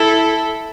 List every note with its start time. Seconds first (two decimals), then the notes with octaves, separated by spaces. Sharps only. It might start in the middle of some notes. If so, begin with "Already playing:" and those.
Already playing: E4 A4